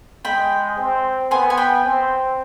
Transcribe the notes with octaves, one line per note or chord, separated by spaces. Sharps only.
G#3 G5 B5
C4
B3 G#5 C6
G#5
G5 B5
C4